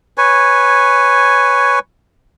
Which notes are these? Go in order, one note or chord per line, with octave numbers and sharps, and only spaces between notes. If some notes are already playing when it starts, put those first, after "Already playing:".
B4 C#5 G#5